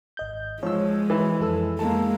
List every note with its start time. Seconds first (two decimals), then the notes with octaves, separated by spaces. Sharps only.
0.17 G#1 D#5 G6
0.63 F3 G#3 C#5 E6
1.10 E3
1.40 F2 A4 E6
1.79 G#3 A#3 A5